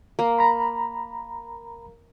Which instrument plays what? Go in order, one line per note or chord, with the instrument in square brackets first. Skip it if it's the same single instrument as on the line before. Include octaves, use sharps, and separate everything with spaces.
[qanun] A#3
[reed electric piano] A#5 B5